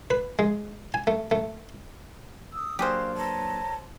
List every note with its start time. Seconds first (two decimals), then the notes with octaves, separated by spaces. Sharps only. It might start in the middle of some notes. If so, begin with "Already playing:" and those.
0.10 B4
0.39 G#3
0.94 G#5
1.07 A3
1.31 A3
2.54 D#6 E6
2.79 F#3 A#3 D4 G4 G#4 C5 F5
3.17 B4 C#5 A5 A#5